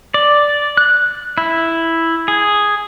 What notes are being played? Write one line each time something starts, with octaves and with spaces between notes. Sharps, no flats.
D5
F#6
E4
G#4